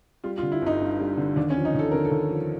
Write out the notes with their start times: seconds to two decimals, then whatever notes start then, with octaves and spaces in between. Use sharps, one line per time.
0.24 G3 F4
0.38 F4
0.42 D3
0.52 E4
0.62 G1 D#4
0.81 G2
1.00 G3
1.17 D3
1.36 D#2 D4
1.50 C#4
1.56 F3
1.65 D#4
1.75 D#2 A4
1.91 D3 A#4
2.05 A4
2.11 D#2
2.31 F3